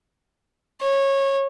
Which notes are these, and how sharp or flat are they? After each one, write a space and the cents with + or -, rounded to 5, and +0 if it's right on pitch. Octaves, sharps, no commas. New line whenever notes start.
C#5 -20